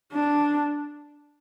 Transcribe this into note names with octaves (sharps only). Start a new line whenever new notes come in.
D4